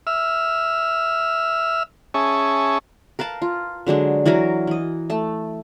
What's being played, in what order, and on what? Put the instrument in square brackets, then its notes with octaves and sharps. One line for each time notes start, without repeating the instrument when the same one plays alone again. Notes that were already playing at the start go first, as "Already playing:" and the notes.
[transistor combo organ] E5 E6 F6
C#4 G#4 E5 A5 C#6
[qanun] A#4 B4 F5 A5
F4
D3 F#3 G#3 D4
E3 F#3 F#4 A#4
E3 D#5
A3 A5